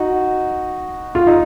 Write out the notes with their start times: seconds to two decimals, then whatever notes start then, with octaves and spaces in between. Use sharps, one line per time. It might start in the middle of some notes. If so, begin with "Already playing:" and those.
Already playing: D#4 F#4
1.15 F4
1.27 D#4